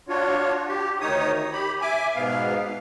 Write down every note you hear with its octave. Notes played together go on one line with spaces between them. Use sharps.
D4 F4 F#4 C#5
G4
D2 D#3 D#4 C#5 D#6
G4 B5
E5 G#5 D6
G#2 B2 B3 F5